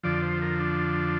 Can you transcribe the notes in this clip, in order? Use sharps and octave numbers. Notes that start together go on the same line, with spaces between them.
F2 D3 F3 D5
C5
A#4
D4